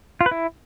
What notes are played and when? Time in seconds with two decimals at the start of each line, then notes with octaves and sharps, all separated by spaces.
0.21 F4
0.26 B4
0.31 E4